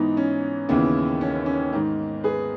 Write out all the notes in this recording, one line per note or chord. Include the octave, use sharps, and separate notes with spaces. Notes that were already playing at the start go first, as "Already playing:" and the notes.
Already playing: G#2 E3 B3 D#4
C#4
D#2 C#3 E3 B3
C#4
C#4
G#2 D#3
G#4 B4